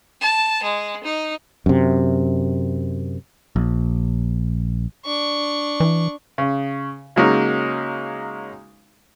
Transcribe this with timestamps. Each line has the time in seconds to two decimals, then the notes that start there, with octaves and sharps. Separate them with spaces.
0.20 A5
0.63 G#3
1.03 D#4
1.66 F#2 C3
3.56 A#1
5.05 D4 C#6
5.80 E3
6.38 C#3
7.16 C#3 F#3 G#3 A#3 C#4 D#4